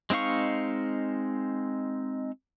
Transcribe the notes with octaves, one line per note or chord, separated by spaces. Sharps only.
G#3 C4 D#4 F5 C#6